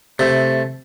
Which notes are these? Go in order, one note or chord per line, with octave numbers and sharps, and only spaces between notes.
C3 A3